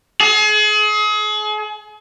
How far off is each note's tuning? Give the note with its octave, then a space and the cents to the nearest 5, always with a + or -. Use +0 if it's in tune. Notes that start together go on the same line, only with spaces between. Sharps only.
G#4 +35